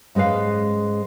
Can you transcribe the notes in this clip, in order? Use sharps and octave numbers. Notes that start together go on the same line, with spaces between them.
G#2 G#3 C#4 B4 F5